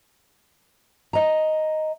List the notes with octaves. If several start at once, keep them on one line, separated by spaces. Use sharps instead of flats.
D#5 A#5